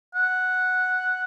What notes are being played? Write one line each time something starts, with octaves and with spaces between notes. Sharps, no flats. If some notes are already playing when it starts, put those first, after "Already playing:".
F#5